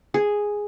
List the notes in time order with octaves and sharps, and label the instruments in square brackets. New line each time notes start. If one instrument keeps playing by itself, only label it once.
[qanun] G#4